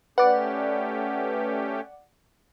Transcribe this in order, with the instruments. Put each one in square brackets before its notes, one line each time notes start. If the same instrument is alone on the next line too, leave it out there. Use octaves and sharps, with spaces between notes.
[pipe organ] A3 C#4 G4 [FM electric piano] B4 [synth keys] D5 F#5